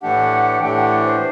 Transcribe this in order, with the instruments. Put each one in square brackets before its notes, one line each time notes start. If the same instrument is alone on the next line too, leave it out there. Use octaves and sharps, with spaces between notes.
[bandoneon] A2 E3 A3 D4 G4 [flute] F#5
[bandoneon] A2 E3 A3 D4 G4 [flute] G5
[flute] F#5
C5